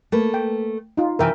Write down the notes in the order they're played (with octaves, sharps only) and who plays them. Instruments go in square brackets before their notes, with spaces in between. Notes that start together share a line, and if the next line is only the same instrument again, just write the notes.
[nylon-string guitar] A3 A#3 B4
[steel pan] G5
D#4 F4
[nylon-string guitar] C3 E3 G#5 [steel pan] A#4 E5 G5